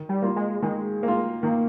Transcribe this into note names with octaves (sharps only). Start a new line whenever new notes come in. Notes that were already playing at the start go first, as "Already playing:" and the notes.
Already playing: D#3
G3
A#3 F4
G#3
D#3 G#3
A#3
F4
D#3 A#3